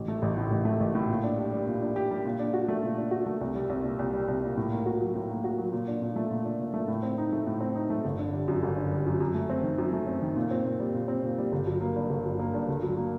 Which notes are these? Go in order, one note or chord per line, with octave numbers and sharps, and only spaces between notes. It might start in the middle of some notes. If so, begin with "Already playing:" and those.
Already playing: A1
A3
A1
A2
A1
A3
A1
A2
A#2
D4
G4
G3
A#2
D4
G4
G3
A#2
D4
F#4
A3
A#2
D4
F#4
A3
C2
G3
C2
A#2
C2
G3
C2
A#2
A2
A#3
F#4
F#3
A2
A#3
F#4
F#3
A#2
D4
A#2
A3
A#2
D4
A#2
A3
A2
C4
D#4
A3
A2
C4
D#4
A3
G1
D3
G3
F#2
G1
D3
G3
F#2
F#2
A3
C4
D#3
F#2
A3
C4
D#3
A#2
C4
A#2
G3
A#2
C4
A#2
G3
G1
F#3
A#3
G2
G1
F#3
A#3
G2
D2
F#3
A#3